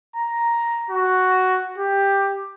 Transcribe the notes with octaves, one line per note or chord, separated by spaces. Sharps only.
A#5
F#4
G4